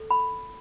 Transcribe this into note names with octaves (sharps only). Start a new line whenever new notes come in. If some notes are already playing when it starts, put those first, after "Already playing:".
Already playing: A4
B5